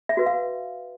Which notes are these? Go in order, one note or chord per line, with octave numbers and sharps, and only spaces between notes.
E5
F#4 B4
F5